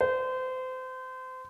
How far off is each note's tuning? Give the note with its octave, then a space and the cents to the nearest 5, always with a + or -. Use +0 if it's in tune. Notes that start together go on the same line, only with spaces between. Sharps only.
C5 -30